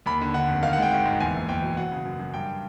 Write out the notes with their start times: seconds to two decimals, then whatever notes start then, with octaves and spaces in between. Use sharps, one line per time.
0.06 D#2 B5
0.21 D3
0.34 D3 F#5
0.48 F1
0.63 D#3 F5
0.73 F#5
0.78 G#3 G5
0.91 G#1 G5
1.05 G#2
1.20 E2 G#5
1.35 F#1
1.49 E2 G5
1.63 B2
1.77 F#3 F#5
1.92 C#3
2.05 F#2
2.19 F#2
2.34 G2 G5